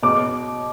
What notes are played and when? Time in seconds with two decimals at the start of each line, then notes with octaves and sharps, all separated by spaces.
0.03 B2 D6